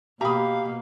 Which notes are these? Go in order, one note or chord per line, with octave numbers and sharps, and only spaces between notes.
B2 A#3 G4 F5 A#5 B5 D#6